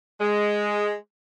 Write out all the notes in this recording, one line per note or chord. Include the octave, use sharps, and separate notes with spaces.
G#3